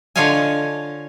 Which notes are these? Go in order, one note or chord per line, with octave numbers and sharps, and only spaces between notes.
D3 F4 C#5 D#5 F5 G#5